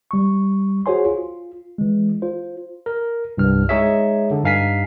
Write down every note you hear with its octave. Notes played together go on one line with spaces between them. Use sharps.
G3 C#6
F#4 G#4 C5 C#5 G#5 C6
F4
E3 G#3
F4 C5
A#4
C2 G2 F6
G#3 D#4 G#4 C#5 E5
D3
G2 D#4 F5 G#5 B6 C7